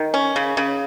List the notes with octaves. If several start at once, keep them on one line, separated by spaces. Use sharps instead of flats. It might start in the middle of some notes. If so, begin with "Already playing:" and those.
Already playing: D#3
C#4
C#3
C#3